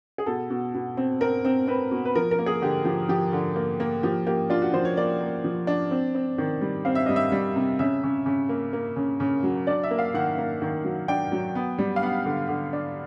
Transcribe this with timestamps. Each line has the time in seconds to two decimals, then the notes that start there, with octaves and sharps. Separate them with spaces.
0.18 G#4
0.26 B2 A4
0.50 B2
0.74 B2
0.97 C4
1.21 C4 A#4
1.45 C4
1.67 C4 B4
1.91 B2
2.05 B4
2.15 F3 A#4
2.31 A#4
2.39 A#3
2.46 G#4
2.62 D3 G4
2.85 F3 G4
3.09 F3 G4
3.33 D3
3.56 A#3
3.80 A#3
4.03 F3 G4
4.27 A#3 G4
4.50 D4 F4
4.62 F#4
4.73 F3 C5
4.85 C#5
4.97 A#3 D5
5.20 A#3
5.44 F3
5.67 D4
5.91 C4
6.15 C4
6.38 D#3
6.61 G3
6.85 C4 F5
6.95 E5
7.06 G3 D#5
7.16 E5
7.32 G3
7.56 C3
7.79 C#3 E5
8.03 C#3
8.26 C#3
8.49 A#3
8.73 A#3
8.96 C#3
9.20 C#3
9.43 F#3
9.67 D4 D5
9.83 E5
9.91 A#3
9.99 F5
10.14 D#3 F#5
10.38 A#3
10.62 D#3
10.85 F#3
11.08 D4 G5
11.32 F#3
11.55 B3
11.79 G3
11.96 F5
12.02 B3 F#5
12.25 D3
12.49 D3
12.73 D4